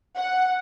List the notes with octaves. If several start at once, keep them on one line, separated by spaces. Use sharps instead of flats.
F#5